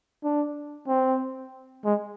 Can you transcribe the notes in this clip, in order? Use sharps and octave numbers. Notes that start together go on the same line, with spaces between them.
D4
C4
G#3